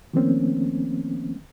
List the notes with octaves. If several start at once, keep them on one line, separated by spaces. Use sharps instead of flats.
D#3 F3 A3 A#3 C4 C#4